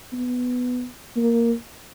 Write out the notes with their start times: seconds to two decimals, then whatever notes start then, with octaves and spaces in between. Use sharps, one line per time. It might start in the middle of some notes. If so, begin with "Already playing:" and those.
0.13 B3
1.16 A#3